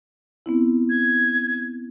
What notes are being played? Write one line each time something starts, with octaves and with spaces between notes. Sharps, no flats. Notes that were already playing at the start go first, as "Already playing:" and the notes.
B3 C4 E4
G#6